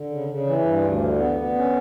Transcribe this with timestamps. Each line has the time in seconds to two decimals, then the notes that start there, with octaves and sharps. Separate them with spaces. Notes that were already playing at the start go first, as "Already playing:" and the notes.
Already playing: D3
0.10 C#3
0.29 C#3
0.46 E3
0.65 G2
0.83 D2
1.01 D3
1.19 B3
1.37 B3
1.55 C#4